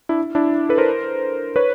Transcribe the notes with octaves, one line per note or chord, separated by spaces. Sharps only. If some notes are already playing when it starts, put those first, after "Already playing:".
D4 E4
D4 E4
A4 B4
A#4 C5
B4 C#5